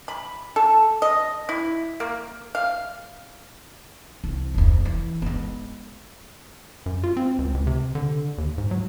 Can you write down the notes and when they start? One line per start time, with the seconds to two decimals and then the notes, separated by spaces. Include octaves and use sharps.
0.08 B5
0.56 A4
1.02 D#5
1.49 E4
2.00 A#3
2.55 F5
4.24 C2
4.54 F1 D2
4.85 E3
5.22 G#3 B3
6.86 F#2
7.04 F4
7.17 C4
7.38 C#2
7.54 C#2
7.67 C3
7.95 D3
8.38 D#2
8.58 G#2
8.71 F#3